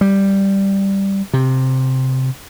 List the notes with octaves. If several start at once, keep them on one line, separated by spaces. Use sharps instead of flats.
G3
C3